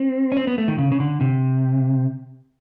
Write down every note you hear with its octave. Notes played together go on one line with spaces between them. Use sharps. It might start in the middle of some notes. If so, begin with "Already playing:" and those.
Already playing: C4
C#4
C4
B3
A3
D#3
C#3
C#3
D3
C3